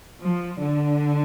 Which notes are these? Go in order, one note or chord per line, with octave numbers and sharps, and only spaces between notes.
F3
D3